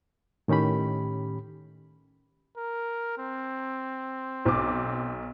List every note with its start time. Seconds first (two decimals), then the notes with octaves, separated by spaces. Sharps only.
0.48 A2 D#3 C#4 G4 B5
2.57 A#4
3.18 C4
4.45 B1 D6